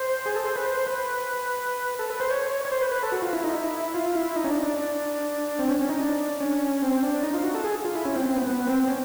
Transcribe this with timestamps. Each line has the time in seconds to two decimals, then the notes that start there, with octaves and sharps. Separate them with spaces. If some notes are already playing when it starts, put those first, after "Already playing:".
Already playing: C5
0.26 G#4
0.35 A4
0.45 C5
0.56 B4
0.66 C5
0.87 B4
1.99 A4
2.10 B4
2.20 C5
2.31 C#5
2.51 C#5
2.65 C#5
2.71 C5
2.81 B4
2.91 B4
3.03 A4
3.12 F#4
3.22 F4
3.33 E4
3.44 D#4
3.53 E4
3.94 F4
4.15 E4
4.36 D#4
4.44 C#4
4.49 D4
4.63 D4
5.59 C4
5.69 C#4
5.80 C#4
5.89 D#4
6.00 D4
6.40 C#4
6.82 C4
7.03 D4
7.23 D#4
7.33 F4
7.44 F#4
7.55 A4
7.64 G#4
7.85 F4
7.95 E4
8.05 C#4
8.16 C4
8.26 C4
8.36 B3
8.47 B3
8.67 C4
8.88 C#4